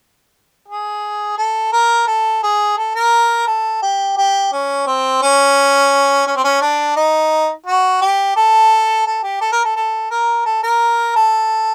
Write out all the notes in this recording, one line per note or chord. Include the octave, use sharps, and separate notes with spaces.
G#4
A4
A#4
A4
G#4
A4
A#4
A4
G4
G4
C#4
C4
C#4
C#4
C4
C#4
D4
D#4
F#4
G4
A4
A4
G4
A4
A#4
A4
A4
A#4
A4
A#4
A4